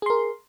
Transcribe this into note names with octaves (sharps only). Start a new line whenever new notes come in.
G#4 A#4 C6